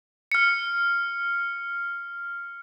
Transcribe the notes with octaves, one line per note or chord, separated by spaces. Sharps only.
F6 C#7